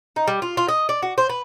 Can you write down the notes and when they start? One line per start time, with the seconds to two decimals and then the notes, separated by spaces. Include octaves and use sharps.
0.16 D#4
0.27 G3
0.42 F4
0.57 F4
0.68 D#5
0.89 D5
1.02 F#4
1.18 C5
1.29 B4